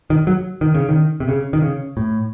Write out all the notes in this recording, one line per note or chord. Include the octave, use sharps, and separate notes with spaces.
D#3
F#3
D#3
C#3
D#3
C3
C#3
D#3
C#3
A2